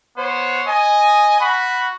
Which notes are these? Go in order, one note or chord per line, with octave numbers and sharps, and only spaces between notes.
B3 C5 C#5
D#5 G#5
F#4 B5